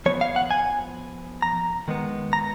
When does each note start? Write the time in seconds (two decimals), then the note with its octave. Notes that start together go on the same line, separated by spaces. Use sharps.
0.06 F3 B3 C#5
0.21 F5
0.36 F#5
0.51 G#5
1.42 A#5
1.88 D#3 G#3 B3
2.33 A#5